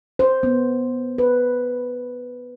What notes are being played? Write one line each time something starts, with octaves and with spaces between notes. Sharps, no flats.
C5
B3
B4